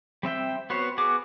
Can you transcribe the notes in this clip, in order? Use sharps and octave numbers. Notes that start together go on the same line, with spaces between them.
G3 C4 E5 G5
B3 F#4 C5 C#5
B3 F#4 G#4 D6